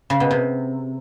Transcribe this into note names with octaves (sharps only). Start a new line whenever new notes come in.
C#3
B2
C3